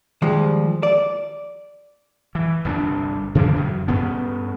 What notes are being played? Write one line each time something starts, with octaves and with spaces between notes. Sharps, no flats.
D#2 F3 G3 G#3
D5
E3
G1 C2 C#4 D4
C#3 E3 A#3 D4
F#2
G2 B3 C#4